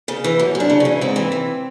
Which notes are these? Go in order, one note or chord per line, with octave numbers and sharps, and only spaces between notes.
C#3
E3
F#2 C#4
F#2
D4
C#3
E3 C#4
G#2 C4
E3
E3